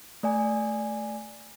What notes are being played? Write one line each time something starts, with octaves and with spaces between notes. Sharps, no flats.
A3 D5 G#5